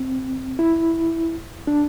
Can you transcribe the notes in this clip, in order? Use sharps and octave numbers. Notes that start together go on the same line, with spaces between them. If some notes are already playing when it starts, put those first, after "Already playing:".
Already playing: C4
E4
D4